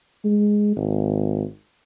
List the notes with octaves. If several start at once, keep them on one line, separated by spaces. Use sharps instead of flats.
G#3
G#1